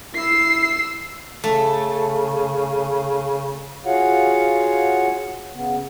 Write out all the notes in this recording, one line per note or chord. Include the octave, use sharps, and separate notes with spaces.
E4 E6 C7
C#3 A3
F4 F#4 G#4 C#5 F5 F#5
C#3 B3